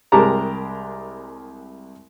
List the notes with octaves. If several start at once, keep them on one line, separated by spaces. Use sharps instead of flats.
C2 G#3 G4 A#4 A5 A#5